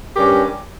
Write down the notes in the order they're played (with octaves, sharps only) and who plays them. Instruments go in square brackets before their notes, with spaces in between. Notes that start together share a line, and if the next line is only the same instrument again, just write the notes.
[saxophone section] G2 G3 C#4 G4 A#4